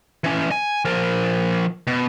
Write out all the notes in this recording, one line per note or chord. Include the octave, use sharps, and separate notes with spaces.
E3 C#4
G#5
F3 A#4
B2